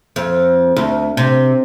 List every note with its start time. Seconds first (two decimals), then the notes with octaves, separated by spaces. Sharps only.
0.16 F2
0.77 D2
1.17 C3